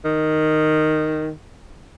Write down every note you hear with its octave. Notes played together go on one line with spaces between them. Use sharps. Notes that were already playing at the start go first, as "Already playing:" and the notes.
D#3